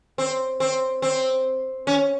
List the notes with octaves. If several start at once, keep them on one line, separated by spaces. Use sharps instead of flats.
C4
C4
C4
C#4